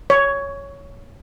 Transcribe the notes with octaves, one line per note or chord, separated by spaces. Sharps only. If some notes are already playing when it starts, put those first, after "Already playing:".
C#5